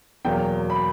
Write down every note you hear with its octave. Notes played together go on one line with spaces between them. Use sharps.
E2 B2 F#3 A#3 G5
B5